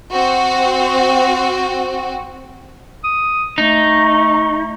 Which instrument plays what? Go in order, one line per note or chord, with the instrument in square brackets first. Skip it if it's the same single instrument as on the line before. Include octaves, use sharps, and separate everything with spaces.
[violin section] C4 F#4
[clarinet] D#6
[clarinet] A3 [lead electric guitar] D#4